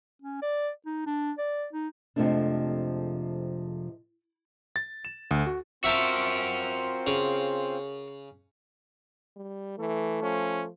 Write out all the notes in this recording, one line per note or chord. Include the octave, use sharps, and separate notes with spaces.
C#4
D5
D#4
D4
D5
D#4
F2 C3 F3 G#3 A3 D4
A6
E7
D2
F#4
C4 F4 F#4 A#4 C5 E5 G5 A5
C#3
G3
E3 A3
F3 C#4